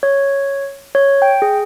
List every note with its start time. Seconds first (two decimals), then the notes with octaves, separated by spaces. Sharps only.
0.03 C#5
0.95 C#5
1.22 G5
1.42 G#4